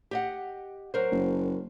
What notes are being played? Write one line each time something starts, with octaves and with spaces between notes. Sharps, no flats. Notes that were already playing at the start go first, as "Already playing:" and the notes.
G4 D#5 F#5
F#3 A#4 C5
F#1